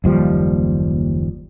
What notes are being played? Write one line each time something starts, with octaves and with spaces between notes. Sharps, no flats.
F#1 D#2 F3 G3